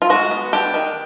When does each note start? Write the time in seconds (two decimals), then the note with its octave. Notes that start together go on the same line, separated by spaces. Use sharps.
0.02 F4
0.10 G#3 F#4
0.31 B3
0.53 D4 G4
0.74 D#3